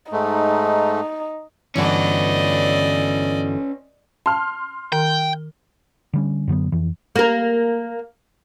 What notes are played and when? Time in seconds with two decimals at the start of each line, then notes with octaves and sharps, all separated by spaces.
0.12 G#2 A3 D#4
1.76 G1 D3 E3 C#4 F#4 B4 D5 D#5
4.26 A5 C6 F6
4.92 D#3 G5
6.13 D3 G3 C#4
6.48 F#2 D3 F#3 B3
6.72 F2 E3
7.16 A#3 A#4